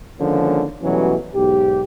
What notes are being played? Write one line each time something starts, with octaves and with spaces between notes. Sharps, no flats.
D3 D#3 F3 G#3 A#3 C#4
B2 E3 F#3 G3 A3 C#4
B1 G#2 G4